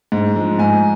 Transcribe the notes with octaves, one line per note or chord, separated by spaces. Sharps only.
G#2
F3 G#3
G#2 G#5